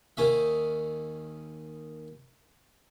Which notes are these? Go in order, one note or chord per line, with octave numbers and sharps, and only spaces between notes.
D#2 D#3 C#4 E5